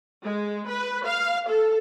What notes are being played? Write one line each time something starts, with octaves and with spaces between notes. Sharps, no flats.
G#3
B4
F5
A4